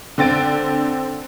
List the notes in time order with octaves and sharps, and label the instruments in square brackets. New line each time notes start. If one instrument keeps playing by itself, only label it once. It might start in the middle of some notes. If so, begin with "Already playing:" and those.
[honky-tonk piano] D3 C4 A6 D7